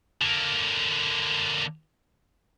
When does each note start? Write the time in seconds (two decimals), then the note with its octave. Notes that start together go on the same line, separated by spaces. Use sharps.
0.22 D3 A#3